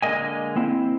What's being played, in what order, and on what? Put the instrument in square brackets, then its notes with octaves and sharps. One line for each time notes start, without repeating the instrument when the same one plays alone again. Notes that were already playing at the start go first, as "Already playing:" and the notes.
[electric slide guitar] D3 G#3 A#3 D#5 G#5
A#3 C4 E4